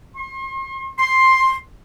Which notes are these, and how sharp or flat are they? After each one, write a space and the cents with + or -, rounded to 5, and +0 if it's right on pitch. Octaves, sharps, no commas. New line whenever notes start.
C6 +40
C6 +10